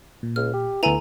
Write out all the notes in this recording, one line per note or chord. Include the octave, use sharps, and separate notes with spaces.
A#2
C#2 F6
G4
D2 B3 E4 A4 G#5 A#5